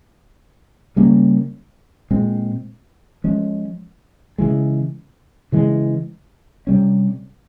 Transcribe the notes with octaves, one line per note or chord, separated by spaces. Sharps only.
C#3 G3 A#3 C#4
A#2 G#3 C4
F3 G#3 C#4
C#3 E3 G#3
C#3 E3 G#3
C3 G3 C#4